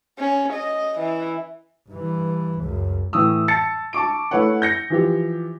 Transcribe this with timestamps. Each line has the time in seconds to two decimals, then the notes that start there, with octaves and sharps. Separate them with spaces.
0.19 C#4
0.53 D#5
0.99 E3
1.89 G2 E3
2.60 C#2 F#2
3.13 A2 E3 D#6 E6
3.48 A5 A6 C#7
3.93 A5 C#6 D6 D7
4.31 A3 E4 B4 C#5 F#5
4.62 G6 A#6 C#7
4.90 E3 F3 G4